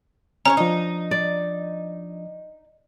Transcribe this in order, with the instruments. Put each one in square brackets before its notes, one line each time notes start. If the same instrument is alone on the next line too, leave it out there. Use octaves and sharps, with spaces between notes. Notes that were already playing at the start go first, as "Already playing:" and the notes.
[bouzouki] C#4 B4 C#5 [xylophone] A#5
[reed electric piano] F3 D4 D#6 [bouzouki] D#4
[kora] D5